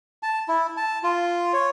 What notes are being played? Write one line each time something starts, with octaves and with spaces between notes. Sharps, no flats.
A5
E4
A5
F4
C#5